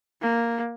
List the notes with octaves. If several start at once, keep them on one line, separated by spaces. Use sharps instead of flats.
A#3